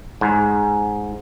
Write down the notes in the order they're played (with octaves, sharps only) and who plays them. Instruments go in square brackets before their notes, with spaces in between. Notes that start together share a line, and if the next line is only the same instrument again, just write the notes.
[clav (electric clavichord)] G#2